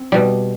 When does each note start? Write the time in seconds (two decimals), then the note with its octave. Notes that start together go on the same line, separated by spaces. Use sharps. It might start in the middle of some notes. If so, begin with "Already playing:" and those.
Already playing: C4
0.12 B2 G3